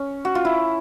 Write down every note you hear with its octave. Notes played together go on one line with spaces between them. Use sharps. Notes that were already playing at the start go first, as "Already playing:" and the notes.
Already playing: C#4
F#4
F4
E4